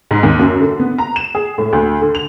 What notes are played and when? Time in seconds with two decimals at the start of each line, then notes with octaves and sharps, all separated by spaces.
0.11 G#2
0.23 D#2
0.39 F#2
0.61 D3
0.80 B3
0.98 A#5
1.16 E7
1.35 G#4
1.58 A2
1.73 D2
2.02 D3
2.15 F7